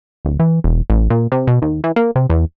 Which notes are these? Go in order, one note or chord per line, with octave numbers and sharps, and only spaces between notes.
D1
E3
E1
A1
A#2
C3
B2
D#2
E3
A#3
C3
E2